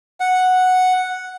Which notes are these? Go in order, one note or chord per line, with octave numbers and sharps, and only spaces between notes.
F#5